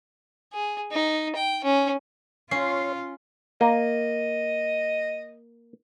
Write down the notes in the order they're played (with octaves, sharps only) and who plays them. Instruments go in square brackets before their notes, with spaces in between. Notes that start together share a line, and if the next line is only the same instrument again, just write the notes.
[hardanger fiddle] G#4
D#4
G5
C#4
[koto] C#4 [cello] F4 [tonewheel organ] C#5 C6
[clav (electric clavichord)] A#3 [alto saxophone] D#5